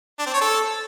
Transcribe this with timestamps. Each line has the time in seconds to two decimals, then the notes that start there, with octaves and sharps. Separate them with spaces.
0.19 D4
0.26 C4
0.34 C#5
0.41 A4